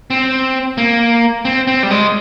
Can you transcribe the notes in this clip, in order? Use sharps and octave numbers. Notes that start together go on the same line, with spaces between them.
C4
A#3
C4
C4
G3
G#3